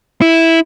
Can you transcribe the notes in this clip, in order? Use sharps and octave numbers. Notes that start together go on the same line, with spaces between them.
E4